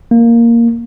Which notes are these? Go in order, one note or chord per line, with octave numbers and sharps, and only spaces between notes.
A#3